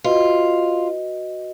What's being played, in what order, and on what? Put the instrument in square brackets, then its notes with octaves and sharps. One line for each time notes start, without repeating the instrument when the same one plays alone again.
[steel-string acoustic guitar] F4 [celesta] F#4 B4 D#5